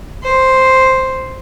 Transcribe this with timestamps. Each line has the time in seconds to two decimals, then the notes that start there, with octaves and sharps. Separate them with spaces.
0.24 C5